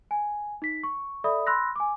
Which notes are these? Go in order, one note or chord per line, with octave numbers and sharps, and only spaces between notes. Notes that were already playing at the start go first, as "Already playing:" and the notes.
G#5
D#4 B6
C#6
A4 D5 E5 B5 D#6
B5 C6 E6 F#6 A#6
G#5 D6